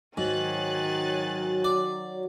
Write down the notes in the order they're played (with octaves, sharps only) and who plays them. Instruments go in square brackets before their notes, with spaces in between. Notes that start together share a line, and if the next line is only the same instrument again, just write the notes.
[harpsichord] G#2 [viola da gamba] D#3 [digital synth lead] F#3 [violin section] G#5 F#6 A6
[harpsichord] D5